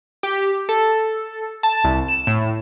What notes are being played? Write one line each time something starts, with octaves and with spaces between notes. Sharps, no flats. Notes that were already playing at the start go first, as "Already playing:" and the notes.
G4
A4
A5
C2
E7
A2